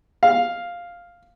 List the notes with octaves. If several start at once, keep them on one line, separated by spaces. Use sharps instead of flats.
F5